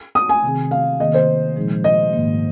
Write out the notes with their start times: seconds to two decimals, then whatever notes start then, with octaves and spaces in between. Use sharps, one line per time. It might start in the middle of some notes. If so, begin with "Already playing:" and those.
0.15 D#6
0.29 G#5
0.43 C3 D#3 C4 G#4
0.71 F5
0.99 C3 D#3 A#3 G#4 D#5
1.14 C5
1.56 A#2 F3 G#3 D#4 G#4
1.84 D#5
2.13 G#2 D#3 A#3